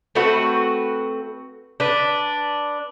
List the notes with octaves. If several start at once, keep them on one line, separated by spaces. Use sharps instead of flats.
A3 C4 F#4 B4
D4 B4